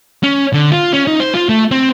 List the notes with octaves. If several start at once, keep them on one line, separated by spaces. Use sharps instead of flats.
C#4
D3
F4
C#4
D#4
C5
F4
A3
C4